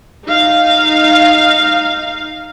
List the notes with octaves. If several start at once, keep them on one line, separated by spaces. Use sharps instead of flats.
D#4 F5